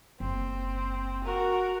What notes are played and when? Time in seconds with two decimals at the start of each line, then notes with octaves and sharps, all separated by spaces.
0.20 F#1 C4
1.24 F#4 A#4